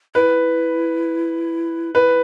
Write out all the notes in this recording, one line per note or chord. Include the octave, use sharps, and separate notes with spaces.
E4 B4
E4 B4